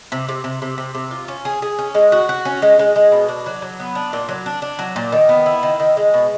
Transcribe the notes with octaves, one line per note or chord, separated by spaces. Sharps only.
C3
C3
C3
C3
C3
C3
F4
C#4
G#4
G#4
C#4
G#3
F#4
F#4
C#4
G#3
G#3
G#3
B2
D4
F#3
F#3
B3
D4
A#2
F#3
D4
D4
F#3
A#2
D#3
B3
E4
D#3
D#3
G#3
B2